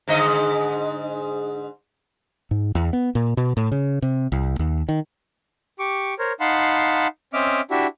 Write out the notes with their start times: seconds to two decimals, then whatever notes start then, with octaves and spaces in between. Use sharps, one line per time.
0.08 G#2 D3 D#5
2.51 G#2
2.75 E2
2.93 B3
3.15 A#2
3.37 B2
3.57 A2
3.72 C#3
4.02 C3
4.32 C2
4.59 D#2
4.89 D#3
5.79 G4 C#6 D6
6.19 A#4 C5 C#5
6.40 D#4 F5 F#5 A5 B5 C6
7.34 C4 C#4 D#5 E5 D6 F6
7.71 D4 E4 F#4 G4 E5